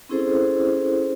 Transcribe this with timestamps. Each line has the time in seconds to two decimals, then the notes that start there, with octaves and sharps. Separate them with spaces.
0.09 C4 C#4 E4 G#4 A4 C5